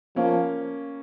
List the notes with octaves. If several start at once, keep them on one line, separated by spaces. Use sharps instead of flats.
F3 A#3 C#4